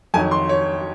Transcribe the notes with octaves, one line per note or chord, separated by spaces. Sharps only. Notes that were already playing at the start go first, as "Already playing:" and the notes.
F2 D#3 F#3 G#5
C6
C#5